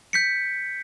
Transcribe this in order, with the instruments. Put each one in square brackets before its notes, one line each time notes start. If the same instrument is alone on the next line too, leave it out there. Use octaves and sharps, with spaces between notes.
[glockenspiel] G6 B6 C#7